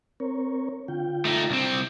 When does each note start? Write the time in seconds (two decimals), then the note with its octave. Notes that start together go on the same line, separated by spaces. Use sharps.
0.20 C4 A#4 C#5
0.88 D3 F4 G5
1.25 A3 D#4
1.50 C2 C4